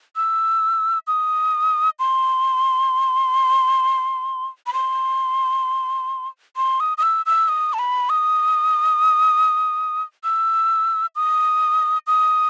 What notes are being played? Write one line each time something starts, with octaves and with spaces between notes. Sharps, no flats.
E6
D#6
C6
B5
C6
C6
D#6
D#6
E6
E6
D#6
A5
B5
D#6
E6
D#6
D#6